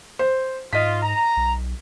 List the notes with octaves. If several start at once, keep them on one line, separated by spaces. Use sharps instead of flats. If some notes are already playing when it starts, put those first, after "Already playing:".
C5
G#2 F4 D#5 B6
A#5
B1